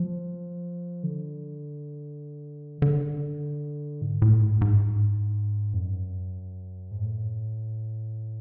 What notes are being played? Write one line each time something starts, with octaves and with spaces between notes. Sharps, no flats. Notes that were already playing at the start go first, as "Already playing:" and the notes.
Already playing: F3
D3
D3
G#2
A2
G#2
G#2
F2
F#2
G#2
A2